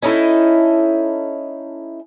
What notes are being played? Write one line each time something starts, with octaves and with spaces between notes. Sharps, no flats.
C#4 D#4 E4 A4